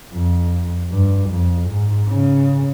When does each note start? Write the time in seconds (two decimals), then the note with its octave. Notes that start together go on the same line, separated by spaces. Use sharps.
0.13 F2
0.91 G2
1.30 F2
1.69 G#2
2.09 C#3